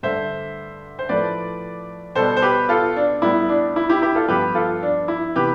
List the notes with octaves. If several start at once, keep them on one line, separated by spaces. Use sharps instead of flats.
G2 D3 A3 C5 E5
C5
A2 F3 A3 B4 D5
B2 G3 B3 A4 C5
C5
G4 B4
F4 A4
D4
A2 G3 B3 E4
D4
E4
E4 G4
E4 G4
F4 A4
G2 F3 B3 G4 B4
F4 A4
D4
E4
C3 E3 B3 G4 B4